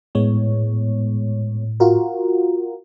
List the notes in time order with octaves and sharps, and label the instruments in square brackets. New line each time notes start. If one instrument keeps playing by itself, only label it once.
[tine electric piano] A2 [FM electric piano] G#3 B3 C#5
[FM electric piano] F4 F#4 A#4